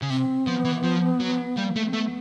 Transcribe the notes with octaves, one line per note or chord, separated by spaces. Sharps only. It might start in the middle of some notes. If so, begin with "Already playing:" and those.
C#3
C3 C4
F3 B3
E3
F3
F#3
G3 A#3
A3
C4
A3 B3